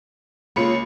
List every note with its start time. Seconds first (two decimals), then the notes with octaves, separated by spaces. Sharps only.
0.56 C#2 A#3 C#4 F4 B5 C#7